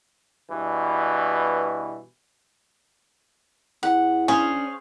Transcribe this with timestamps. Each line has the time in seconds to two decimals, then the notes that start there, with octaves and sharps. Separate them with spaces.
0.51 G2 B2 E3
3.83 E2 F#5
4.28 C#4 D4 G#4 C5 C#5 F5